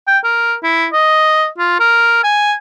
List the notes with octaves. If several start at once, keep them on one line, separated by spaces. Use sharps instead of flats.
G5
A#4
E4
D#5
F4
A#4
G#5